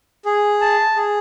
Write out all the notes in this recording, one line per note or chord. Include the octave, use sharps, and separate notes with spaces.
G#4
A5
G#4